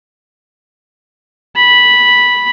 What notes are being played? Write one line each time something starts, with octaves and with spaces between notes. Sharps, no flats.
B5